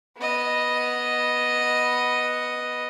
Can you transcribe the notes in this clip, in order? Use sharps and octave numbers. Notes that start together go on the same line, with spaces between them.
B3 D#5